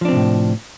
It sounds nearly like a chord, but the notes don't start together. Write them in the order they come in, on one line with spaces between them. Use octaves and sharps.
F3 D4 C4 C3 A2